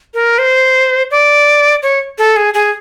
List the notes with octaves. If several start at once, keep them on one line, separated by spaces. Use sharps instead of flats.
A#4
C5
D5
C#5
A4
G#4
G#4